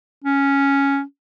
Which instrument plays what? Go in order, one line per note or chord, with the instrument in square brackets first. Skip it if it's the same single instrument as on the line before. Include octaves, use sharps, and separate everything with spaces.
[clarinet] C#4